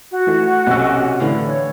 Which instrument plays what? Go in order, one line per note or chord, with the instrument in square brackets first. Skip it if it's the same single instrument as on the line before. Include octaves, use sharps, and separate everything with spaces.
[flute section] F#4
[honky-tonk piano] E3 A3
[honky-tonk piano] B1 E6 [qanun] C3 C#4
[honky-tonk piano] A2 [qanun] D3 E3 F5
[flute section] C#5